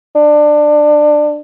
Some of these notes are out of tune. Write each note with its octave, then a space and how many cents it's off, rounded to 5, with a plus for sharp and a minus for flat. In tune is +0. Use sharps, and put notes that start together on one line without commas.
D4 +20